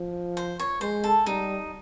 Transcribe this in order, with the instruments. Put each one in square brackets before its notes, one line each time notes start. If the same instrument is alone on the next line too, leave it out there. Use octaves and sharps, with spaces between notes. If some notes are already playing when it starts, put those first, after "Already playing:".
Already playing: [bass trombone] F3
[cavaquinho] C5
C#5
[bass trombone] G#3 [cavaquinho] C5
[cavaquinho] A4
[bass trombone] G3 [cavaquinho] D#4